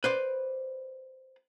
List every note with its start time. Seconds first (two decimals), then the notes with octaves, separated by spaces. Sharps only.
0.04 B4 C5 D5